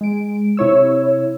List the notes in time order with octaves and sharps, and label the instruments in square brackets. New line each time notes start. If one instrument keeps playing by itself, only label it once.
[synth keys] G#3 D7
C3 E4 C#5 E6